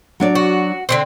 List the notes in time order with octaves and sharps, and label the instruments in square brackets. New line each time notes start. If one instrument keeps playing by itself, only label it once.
[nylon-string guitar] F#3 D4 D5
[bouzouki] F#4
D3 E3 C4